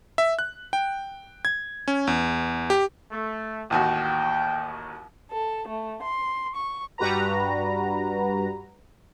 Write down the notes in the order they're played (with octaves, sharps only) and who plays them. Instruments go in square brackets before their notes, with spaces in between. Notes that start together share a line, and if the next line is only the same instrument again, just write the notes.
[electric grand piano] E5
F#6
G5
G#6
C#4
E2
G4
[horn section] A3
[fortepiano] A1 D#2 F#4 [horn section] G5
[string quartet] A4
A3
C6
C#6
[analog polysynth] G2 G3 F#4 B4 A#5